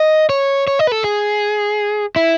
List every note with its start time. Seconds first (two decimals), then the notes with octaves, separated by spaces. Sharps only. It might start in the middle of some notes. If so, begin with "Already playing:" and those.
Already playing: D#5
0.29 C#5
0.67 C#5
0.79 D#5
0.87 B4
0.92 A4
1.04 G#4
2.16 E4